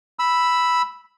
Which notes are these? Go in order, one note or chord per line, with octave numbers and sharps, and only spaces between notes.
B5 E6